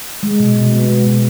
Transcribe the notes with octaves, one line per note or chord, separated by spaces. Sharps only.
G#3
B2
B2
B3
G#3
B2